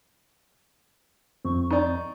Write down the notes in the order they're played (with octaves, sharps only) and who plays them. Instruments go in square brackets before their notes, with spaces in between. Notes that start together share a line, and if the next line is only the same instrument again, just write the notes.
[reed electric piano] F2 C4 [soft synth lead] C#6
[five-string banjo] D#4 D5